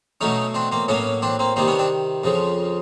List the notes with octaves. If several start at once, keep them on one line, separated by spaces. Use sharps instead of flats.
B2 F#3 A3 C#4 D#4
C4 D4
A#3 C4
A2 F#3 A#3 B3 C#4
C4 D4
A#3 C4
C3 D#3 G3 A#3 C4
B3 C#4
C4 D4
F2 C#3 F3